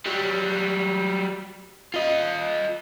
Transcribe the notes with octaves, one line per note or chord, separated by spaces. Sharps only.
F#3 G3
F4 D#5